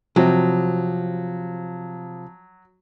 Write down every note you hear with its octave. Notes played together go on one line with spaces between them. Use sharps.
C3 F3 F#3